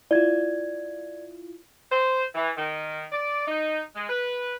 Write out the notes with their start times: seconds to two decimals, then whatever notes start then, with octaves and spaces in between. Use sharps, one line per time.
0.11 E4 F4 D5 G#6
1.92 C5
2.35 E3
2.57 D#3
3.12 D5
3.47 D#4
3.95 G#3
4.09 B4